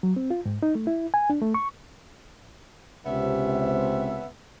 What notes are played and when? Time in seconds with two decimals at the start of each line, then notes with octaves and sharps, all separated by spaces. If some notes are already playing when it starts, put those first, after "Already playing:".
0.03 F#3
0.16 C4
0.30 F4
0.46 G#2
0.63 D#4
0.75 A3
0.87 E4
1.14 G#5
1.30 D4
1.41 A3
1.54 C#6
3.06 C#2 C3 B3 C#4 E5